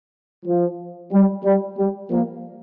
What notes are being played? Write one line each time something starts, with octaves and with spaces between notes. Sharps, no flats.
F3
G3
G3
G3
F3 A#3